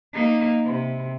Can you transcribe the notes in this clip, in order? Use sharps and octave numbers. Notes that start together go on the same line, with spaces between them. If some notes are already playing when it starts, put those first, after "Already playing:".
A#3 D#4
C3